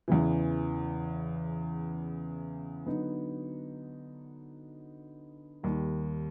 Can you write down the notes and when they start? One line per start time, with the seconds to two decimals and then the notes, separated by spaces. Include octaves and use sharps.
0.08 E2 C#3 E3
2.86 D3 F#3 B3 D#4 F#4
5.63 D#2 D#3 G3